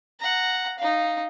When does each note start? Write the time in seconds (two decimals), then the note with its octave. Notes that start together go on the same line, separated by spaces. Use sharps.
0.20 F#5 A#5
0.78 D#4 F5